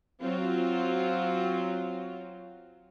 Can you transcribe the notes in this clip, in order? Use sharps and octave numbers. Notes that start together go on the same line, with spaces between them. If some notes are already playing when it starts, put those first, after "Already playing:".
F#3 C4 F4